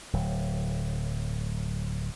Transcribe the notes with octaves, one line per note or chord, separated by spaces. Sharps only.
D1 F#3